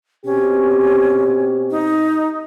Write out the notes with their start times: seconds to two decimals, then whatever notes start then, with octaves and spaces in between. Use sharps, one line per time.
0.24 B2 C4 C#4 G4
1.71 D#4